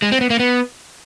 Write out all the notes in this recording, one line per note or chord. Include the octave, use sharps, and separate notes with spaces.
G#3
C4
B3
A#3
B3